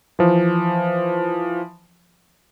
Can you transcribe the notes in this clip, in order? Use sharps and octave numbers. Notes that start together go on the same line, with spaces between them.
E3 F3